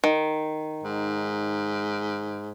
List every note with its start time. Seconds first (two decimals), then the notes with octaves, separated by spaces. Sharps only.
0.04 D#3
0.84 G#2